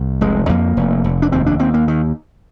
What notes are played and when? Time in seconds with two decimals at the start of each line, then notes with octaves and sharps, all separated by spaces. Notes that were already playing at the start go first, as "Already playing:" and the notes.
Already playing: C2
0.21 F1 G#3
0.49 F2 A#3
0.77 F1
1.04 F1
1.22 D4
1.32 D#2 C4
1.46 D4
1.59 D#2 C4
1.74 A#3
1.88 D#3